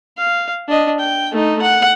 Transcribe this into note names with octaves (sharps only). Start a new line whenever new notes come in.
F5
D4 D#5
G5
A3 D#4
F#5